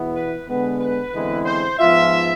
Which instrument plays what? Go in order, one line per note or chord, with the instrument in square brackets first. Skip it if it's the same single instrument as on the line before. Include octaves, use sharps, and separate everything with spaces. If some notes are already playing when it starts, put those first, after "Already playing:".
Already playing: [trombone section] E2 B2 B3 E4
[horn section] B4
[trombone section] D3 G#3 B3 [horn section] B4
[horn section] B4
[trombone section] E2 D3 G#3 C4 E4
[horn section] C5
[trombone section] G#2 F3 B3 F4 [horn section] E5